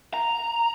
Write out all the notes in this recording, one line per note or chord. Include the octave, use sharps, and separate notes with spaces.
A#5